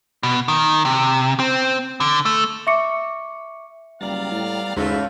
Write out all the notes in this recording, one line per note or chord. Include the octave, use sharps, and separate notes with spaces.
B2
D#3
C3
C4
D3
A3
E5 C#6 D6 C#7
F#1 G3 B3 D5 F5 A#5 A6
A2
D#2 G#2 C#3 E3 A3 F4 F#4 E5